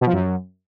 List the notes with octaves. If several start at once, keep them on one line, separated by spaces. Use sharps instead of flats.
B2
F3
F#2